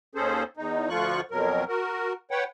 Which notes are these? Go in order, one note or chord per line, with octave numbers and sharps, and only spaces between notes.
D#2 C#4 G#4 A4 C5
E2 D#4
D2 D3 F3 F4 C#6 F#6
F2 B2 F#3 A#4
F#4 A#4
B4 C#5 F#5 G5